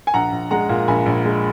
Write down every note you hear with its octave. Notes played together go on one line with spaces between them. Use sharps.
G#5
A#1 F#5 A#5
A#1
G#3 F#5 A#5
A#2
A#1 G#5 B5
A#1
G#3